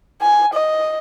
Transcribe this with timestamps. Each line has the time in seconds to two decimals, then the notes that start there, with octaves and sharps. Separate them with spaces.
0.22 G#5
0.54 D#5